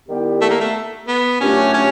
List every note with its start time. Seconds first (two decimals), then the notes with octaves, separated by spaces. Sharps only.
0.08 D#3 G3 B3 E4 G4
0.41 A3
0.50 A#3
0.61 A3
1.08 B3
1.40 A#2 F#3 A3 C#4 D4 G4
1.74 C#4